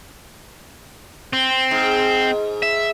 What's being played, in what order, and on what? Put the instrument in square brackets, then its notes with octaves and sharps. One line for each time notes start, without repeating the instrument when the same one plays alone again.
[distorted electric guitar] C4
[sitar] G#2
[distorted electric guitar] E5